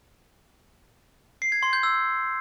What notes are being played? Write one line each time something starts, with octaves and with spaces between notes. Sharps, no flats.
C7
G#6
C6
G6
E6